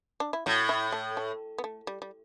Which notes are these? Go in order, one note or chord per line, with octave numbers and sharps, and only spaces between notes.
D4
E4
A2 F#4
E4
A3
A3
B3
A3
G3
G3